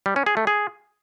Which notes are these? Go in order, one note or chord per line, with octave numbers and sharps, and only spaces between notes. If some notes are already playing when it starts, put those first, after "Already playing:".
G3
C#4
G#4
A3
G#4